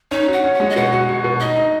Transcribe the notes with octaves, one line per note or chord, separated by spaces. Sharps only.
C#4 D#4
F#4 F#5
C#4
F#5
G#3
D#5
B2 F#5
F#4
F#4
B2
D#4 D#5
D#4